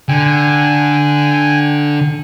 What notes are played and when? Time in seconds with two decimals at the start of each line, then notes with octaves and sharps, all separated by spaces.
0.09 D3 G5 G#5